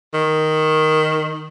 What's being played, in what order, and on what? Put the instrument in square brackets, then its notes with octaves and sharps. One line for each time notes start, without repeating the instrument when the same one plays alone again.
[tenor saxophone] D#3